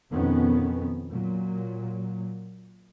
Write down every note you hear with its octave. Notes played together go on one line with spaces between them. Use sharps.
F2 B2 D#3 B3 C#4
A#2 F#3